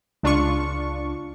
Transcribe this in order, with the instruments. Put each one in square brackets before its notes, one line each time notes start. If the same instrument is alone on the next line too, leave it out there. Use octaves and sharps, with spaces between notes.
[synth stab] C#2 D4 F4 C#6